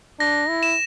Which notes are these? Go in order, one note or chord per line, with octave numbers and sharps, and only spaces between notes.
D4 A#6
E4
E7